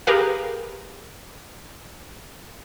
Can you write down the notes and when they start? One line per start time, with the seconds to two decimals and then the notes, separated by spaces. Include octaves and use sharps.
0.07 G4 G#4 A#4 B4 F5